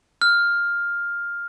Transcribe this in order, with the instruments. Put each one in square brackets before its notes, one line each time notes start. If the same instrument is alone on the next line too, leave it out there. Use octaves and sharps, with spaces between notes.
[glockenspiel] F6